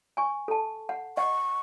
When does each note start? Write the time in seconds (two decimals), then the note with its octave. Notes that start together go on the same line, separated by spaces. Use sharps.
0.17 G#5 C#6
0.48 A4 A5
0.89 F#5
1.17 D#5 F#5 C#6